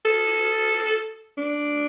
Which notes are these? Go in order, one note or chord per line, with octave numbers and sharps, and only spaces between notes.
A4
D4